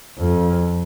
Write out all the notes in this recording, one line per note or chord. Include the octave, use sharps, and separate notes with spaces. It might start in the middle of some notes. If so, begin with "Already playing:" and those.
F2